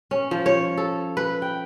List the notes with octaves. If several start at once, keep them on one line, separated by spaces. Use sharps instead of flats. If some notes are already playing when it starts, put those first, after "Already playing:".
C#4
F3
C#5
A4
B4
G5